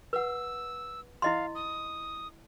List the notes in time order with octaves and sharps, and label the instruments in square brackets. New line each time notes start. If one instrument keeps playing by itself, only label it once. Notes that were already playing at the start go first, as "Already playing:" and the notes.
[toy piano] B4 F#5 [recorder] E6
[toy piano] E4 D#5 C6 [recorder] F5
[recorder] D#6